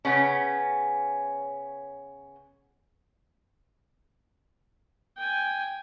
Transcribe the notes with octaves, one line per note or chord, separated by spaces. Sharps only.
C#3 B3 C#4
G5 G#5